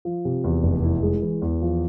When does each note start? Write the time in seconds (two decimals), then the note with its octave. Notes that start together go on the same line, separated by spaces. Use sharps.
0.05 F3
0.25 C3
0.44 E2
0.63 F1
0.83 E4
1.03 G#3
1.22 E3
1.42 E2
1.62 F3